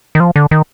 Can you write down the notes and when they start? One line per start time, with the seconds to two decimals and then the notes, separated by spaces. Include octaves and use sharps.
0.15 D#3
0.20 F3
0.36 D3
0.51 D#3